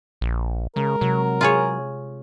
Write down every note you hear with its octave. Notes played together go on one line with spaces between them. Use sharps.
A#1
C#3 G#3 A#4
C3 F#3
F4 G#4 C#5